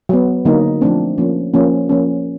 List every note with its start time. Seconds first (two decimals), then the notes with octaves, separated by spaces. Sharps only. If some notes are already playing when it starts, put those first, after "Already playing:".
0.09 F#3 B3
0.45 D3 F#3 A#3 D#4
0.81 F3 A3 C4 D4
1.18 F3 A#3 C#4
1.54 F3 A#3 C#4
1.89 F3 A#3 C#4